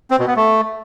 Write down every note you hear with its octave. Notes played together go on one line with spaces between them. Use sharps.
C4
B2
B3
A3